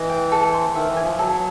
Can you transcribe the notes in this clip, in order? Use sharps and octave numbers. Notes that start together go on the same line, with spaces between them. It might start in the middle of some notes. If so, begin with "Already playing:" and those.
Already playing: E3 D#5
G5
A4
C5
D#3 E5
E3
G#5
F3
F#3 A4